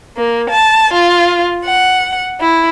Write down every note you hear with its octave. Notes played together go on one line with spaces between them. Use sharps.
A#3
A5
F4
F#5
E4